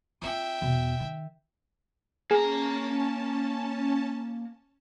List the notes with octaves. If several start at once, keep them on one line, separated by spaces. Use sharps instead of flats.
C4 F4 E5 G5
E2 B2
D#3
A#3 C#4 G#4 A5 A#5